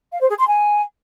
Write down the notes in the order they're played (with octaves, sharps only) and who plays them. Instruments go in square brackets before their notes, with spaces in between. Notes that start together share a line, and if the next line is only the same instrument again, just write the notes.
[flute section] F5
C5
G#4
C6
G#5